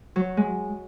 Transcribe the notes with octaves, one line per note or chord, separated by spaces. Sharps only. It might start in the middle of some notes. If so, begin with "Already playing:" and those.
F#3
G#3